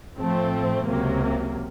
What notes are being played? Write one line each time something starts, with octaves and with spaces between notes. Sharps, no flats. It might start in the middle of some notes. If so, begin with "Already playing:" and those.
A2 F3 A3 C4
C#2 C3 F#3 A#3